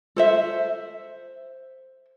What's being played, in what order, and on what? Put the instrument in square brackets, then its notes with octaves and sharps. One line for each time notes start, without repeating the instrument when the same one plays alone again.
[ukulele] A4 C5 E5